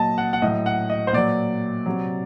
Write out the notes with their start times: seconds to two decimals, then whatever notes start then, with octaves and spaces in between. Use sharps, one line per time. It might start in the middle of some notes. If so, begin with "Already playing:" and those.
Already playing: A#2 F#3 D#5 A5
0.18 F#5
0.33 F#5
0.42 A2 F#3 D#5
0.66 F#5
0.90 D#5
1.07 C5
1.13 A#2 F#3 D5
1.86 C3 F#3